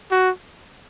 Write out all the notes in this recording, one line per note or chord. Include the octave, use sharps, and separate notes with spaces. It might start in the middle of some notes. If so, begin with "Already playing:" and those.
F#4